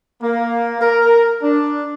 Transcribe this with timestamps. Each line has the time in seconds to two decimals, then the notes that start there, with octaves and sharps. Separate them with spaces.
0.22 A#3
0.80 A#4
1.42 D4